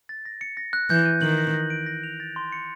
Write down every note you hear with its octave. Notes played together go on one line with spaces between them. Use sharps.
A6
A#6
C#7
A#6
F#6
E3 G6
D#7
D#3 F#7
A#6
A#6
D7
A#6
F7
A6
C6
C#7